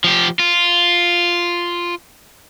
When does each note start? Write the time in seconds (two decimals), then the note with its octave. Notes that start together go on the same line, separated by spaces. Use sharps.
0.04 F3 G4
0.39 F4